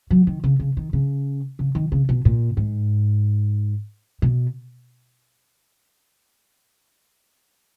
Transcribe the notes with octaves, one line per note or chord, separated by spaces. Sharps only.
F#3
D#3
C#3
C#3
D#3
C#3
C#3
D#3
C#3
B2
A#2
G#2
B2